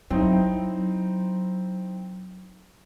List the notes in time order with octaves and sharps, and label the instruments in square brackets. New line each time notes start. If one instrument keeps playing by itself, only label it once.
[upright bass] F#3 [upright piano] C4 D#4 E4